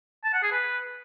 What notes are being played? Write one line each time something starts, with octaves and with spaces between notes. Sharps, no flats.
A5
F#5
G#4
B4